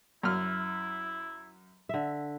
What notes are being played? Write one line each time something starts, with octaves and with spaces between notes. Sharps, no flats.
F#2 E4 F6
D3 E5